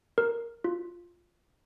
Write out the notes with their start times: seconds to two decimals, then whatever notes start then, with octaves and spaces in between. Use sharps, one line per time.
0.18 A#4
0.64 F4